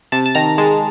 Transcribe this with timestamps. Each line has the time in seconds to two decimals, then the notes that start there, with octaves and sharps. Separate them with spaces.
0.12 C3 A5
0.26 A5
0.35 D#3 A#5
0.58 G#3 A5